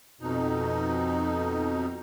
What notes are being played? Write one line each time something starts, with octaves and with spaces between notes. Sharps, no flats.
F2 B2 D#4